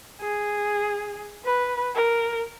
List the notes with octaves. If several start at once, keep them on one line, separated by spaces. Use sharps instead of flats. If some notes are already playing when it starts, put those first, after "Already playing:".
G#4
B4
A#4